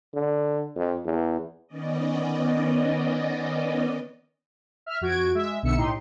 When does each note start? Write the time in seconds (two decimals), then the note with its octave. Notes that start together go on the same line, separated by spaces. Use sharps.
0.14 D3
0.76 F2
1.05 E2
1.67 D#3 B3 C#4 D5 D#5
4.86 E5 F6
5.01 F2 F#4 G#6 D7
5.35 G#3 E5
5.63 B1 B2 D3 E5 E6 C#7
5.75 A2 D#4 G4 C6